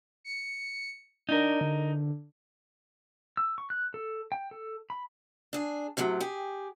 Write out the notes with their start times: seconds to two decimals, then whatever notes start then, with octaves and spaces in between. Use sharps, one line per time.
0.24 C#7
1.29 D4 D#4 A#4
1.61 D3
3.37 E6
3.58 C#6
3.70 F#6
3.94 A4
4.32 G5
4.51 A4
4.90 B5
5.53 D4 G#4
5.97 F#2 A2 C3 F#3
6.20 G4 G#4